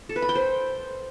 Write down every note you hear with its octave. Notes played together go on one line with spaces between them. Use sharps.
A4
B4
B5
G5
C5